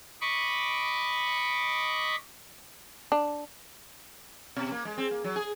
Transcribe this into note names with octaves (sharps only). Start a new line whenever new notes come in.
D#5 B5 C#6 D6
D4
B2
A#3
G#3
C4
A#3
F#3
G#4